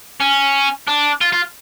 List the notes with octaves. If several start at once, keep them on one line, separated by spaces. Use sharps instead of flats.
C#4
D4
F4
F4